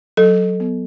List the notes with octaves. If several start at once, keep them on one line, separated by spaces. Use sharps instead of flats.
F#3 A4
B3